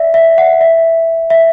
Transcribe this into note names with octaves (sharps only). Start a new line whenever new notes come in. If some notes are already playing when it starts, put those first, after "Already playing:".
Already playing: D5 E5
E5
F#5
E5
E5